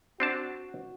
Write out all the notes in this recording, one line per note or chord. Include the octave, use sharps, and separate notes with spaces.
C4 D4 F#4 A5